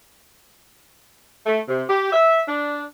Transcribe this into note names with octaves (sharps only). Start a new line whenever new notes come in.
A3
C3
G4
E5
D4